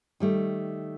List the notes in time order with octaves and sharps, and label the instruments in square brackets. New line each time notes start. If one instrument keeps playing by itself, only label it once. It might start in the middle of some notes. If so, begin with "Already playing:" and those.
[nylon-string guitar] D#3 G3 A3